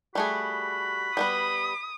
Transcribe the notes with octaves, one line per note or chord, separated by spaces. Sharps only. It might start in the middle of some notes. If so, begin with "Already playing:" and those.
G3 A3 F#4 G#4 B5
G3 B3 B4 D#6